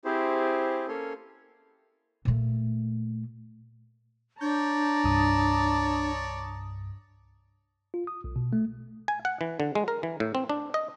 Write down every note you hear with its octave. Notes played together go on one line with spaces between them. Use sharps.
C4 E4 G4 G#4 C5
A#3 C#4 A4 C#5 C6
A#2 A3
D4 C#5 D5 A5 A#5 G6
C2 G2 D#6
F4
D#6
B1
B2
A3
G#5
F#5
E3
D3
G#3
A#4
E3
A2
C4
D4
D#5